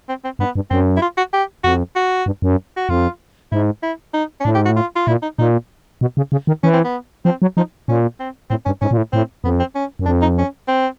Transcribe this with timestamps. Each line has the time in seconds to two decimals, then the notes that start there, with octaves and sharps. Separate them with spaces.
0.09 C4
0.24 C4
0.39 G2 B3
0.56 G2
0.70 F#2 C4
0.96 E4
1.02 F4
1.17 F#4
1.33 G4
1.64 F2 F#4
1.96 F#4
2.26 G2
2.42 F#2
2.77 F#4
2.89 F2 F4
3.52 G#2 E4
3.83 E4
4.14 D#4
4.41 C#4
4.45 A2 D4
4.55 G#2 G4
4.65 F#4
4.69 A2
4.76 F4
4.96 F4
5.07 A#2 E4
5.23 D#4
5.39 A#2 D#4
6.01 B2
6.17 C#3
6.32 C#3
6.47 D#3
6.63 E3 C#4
6.74 C4
6.84 B3
7.25 F3 C4
7.42 F#3
7.57 F3 D#4
7.88 A#2 C#4
8.20 C4
8.50 A2 C4
8.65 G2 C#4
8.81 G#2 C#4
8.91 A#2
8.97 A2
9.13 A2 C4
9.44 F2 B3
9.60 C4
9.75 C#4
9.99 F#2
10.06 F2 D4
10.22 D#4
10.38 C#4
10.68 C4